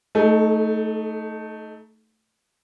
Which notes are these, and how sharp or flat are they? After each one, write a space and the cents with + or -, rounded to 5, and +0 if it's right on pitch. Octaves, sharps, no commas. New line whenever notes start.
A3 +5 D#4 +10 A4 -40